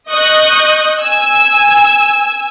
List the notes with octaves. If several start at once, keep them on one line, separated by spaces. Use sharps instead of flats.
D#5 C#6 D#6 F#6 G6
G#5 E6